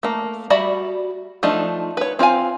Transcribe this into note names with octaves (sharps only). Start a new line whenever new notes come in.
A3 A#3
G3 F#4 D5 E5 B5
F3 A3 D4 D#4
B4 C#5
C4 F4 F5 G#5